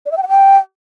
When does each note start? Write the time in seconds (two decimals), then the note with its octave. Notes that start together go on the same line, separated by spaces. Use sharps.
0.06 D5
0.11 E5
0.17 G5
0.23 F#5
0.29 G5